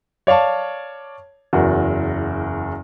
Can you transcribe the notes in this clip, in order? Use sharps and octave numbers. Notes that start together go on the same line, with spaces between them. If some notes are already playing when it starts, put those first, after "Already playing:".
C#5 D5 F5 A5 C#6
F#1 E2 F#4 A#4